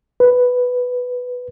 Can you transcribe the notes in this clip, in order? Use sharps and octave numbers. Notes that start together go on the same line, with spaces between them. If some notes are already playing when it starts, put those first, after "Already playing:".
B4